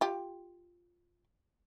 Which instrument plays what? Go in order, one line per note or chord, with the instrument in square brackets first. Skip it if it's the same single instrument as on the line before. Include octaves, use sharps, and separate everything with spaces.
[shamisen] F4 G4